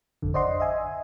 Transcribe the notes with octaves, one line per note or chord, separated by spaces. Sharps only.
G#1 F2 D3
C5 D5 D#5 F#5 C6
D#5 E5 G#5